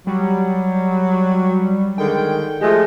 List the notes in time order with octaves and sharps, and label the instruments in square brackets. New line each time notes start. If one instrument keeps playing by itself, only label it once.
[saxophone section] F#3 [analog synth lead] G3
[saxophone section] D3 D#3 G#3 [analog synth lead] G5
[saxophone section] F3 G#3 A3 [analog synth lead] G4